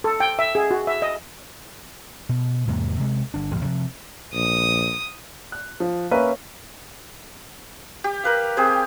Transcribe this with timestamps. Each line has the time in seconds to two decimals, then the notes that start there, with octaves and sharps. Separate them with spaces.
0.04 A4
0.20 G5
0.39 E5
0.55 G#4
0.71 F#4
0.87 E5
1.02 D#5
2.29 B2
2.67 E2 G#2 C3 A#3
3.00 C3 G#3
3.34 G1 D4
3.52 A1 E2
3.65 C3 F3
4.34 A#1 D#6
5.52 F#6
5.80 F3
6.11 A#3 C#4 A#4 B4 E5
8.04 G4
8.24 A#4 B4 F5
8.57 C4 G4 G#4 C5